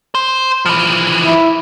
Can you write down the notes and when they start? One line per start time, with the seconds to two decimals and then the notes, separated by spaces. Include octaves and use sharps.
0.15 C5
0.66 E3 F3
1.26 E4